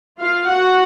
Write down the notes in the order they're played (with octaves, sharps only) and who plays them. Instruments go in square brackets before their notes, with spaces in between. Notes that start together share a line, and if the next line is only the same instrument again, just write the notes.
[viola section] F4 F5
F#4 F#5